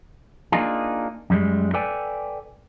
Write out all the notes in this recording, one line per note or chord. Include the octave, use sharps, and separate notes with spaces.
A#3 D4 D#4 F4 G#4
F#2 G3 G#3
A4 B4 D5 G5 G#5